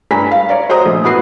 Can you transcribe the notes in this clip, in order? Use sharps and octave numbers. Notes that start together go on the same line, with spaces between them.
G2 G3 G#5 A#5 B6
F5
C#5 D5 A#5
F#4 C5 D#5 A#5 D#6
A#1
A2 B3 F#4 B4 C7